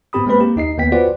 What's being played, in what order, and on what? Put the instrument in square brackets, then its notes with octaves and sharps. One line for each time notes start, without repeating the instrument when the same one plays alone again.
[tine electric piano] G#2 B3 C4 G4 B5 D#6
G#3 A#3 C4 B4 B5
A#3 G4
D#2 D#4 D#5 C7
D#2 A#3 B3 G5 B6
F4 F#4 B4 C5 D5 F#5